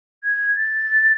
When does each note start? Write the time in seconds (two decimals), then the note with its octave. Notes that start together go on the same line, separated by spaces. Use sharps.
0.24 G#6
0.56 A6